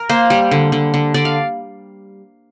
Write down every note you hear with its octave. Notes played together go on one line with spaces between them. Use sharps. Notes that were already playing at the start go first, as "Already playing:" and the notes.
Already playing: A#4
A#3 C5
G3
D3
D3
D3
D3 D5
F5